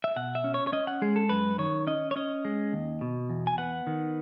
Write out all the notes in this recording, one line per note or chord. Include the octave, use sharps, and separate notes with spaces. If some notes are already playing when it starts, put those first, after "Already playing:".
E5
B2 F#5
E5
C#4
C#5
C#5
C#4 D#5
F#5
G#3 G#4
A4
F#2 B4
D#3 C#5
C#4 D#5
C#5
C#4 D#5
G#3
D#2
B2
E2
G#5
B3 F#5
D#3